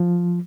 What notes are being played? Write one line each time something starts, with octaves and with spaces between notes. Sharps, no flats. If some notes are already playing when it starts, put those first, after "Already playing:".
Already playing: F3